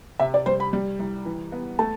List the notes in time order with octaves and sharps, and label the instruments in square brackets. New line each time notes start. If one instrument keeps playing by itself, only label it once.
[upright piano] C3 [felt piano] E5
[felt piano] D5
[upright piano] G3 [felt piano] C5
[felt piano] B5
[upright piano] G3
C2
E3
B3
[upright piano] A3 [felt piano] A5